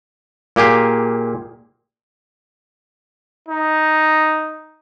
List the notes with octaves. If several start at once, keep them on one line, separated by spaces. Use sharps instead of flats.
A#2 A#3 G4 G#4
D#4